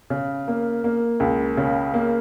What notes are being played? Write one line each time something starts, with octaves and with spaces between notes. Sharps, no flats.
C#3
A#3
A#3
C#2
C#3
A#3